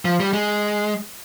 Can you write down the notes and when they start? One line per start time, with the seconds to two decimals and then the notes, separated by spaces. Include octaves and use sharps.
0.05 F3
0.20 G3
0.33 G#3